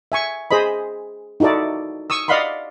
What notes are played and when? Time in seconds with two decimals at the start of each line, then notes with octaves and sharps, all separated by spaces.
0.12 E5 G#5 C#6
0.51 G#4 C5 D#5 B5
1.40 D#4 E4 F#4 A4 D5
2.10 C#6 D#6 E6
2.28 D5 D#5 F5 F#5 B5 C6